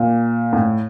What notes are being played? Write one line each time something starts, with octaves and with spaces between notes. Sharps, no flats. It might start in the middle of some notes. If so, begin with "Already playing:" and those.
Already playing: A#2
A2